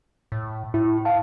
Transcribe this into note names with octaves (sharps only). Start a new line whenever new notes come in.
A2
A2 E4
F5 A5